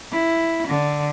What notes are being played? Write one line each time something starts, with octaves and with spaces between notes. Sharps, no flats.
E4
D3